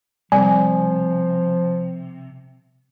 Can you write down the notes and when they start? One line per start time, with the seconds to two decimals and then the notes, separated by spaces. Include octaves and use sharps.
0.32 C3 F3 G3 G#5